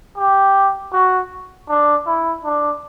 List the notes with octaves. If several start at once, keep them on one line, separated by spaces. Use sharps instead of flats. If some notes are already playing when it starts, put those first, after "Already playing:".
G4
F#4
D4
E4
D4